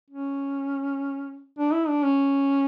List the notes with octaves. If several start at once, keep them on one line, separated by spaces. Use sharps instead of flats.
C#4
D4
E4
D4
C#4